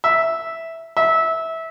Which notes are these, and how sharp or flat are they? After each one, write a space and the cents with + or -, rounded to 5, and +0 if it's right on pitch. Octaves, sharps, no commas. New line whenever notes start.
E5 -5
E5 -20